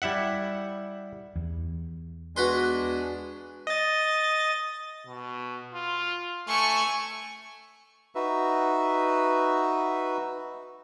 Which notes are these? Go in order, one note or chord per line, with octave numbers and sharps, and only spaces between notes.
G3 E4 E5 F#5
E2
G#3 B3 D4 F#4 B4 C6
D#5 A6
B2
F4
A3 G#5 C#6
D#4 F#4 B4 E5